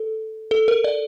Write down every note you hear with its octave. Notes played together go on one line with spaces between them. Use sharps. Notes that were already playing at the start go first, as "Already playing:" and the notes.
Already playing: A4
A4
A#4
D5